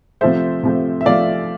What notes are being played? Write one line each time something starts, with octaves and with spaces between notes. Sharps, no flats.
C3 F3 A3 C5 E5
C3 F3 A3
E5
C3 F3 A3 D5 F5